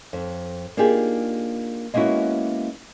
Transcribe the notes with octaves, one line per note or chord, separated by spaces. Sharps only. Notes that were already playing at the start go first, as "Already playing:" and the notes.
F2
A#3 D4 D#4 F4 G4 G#4
G#3 A#3 B3 C#4 E4 F#4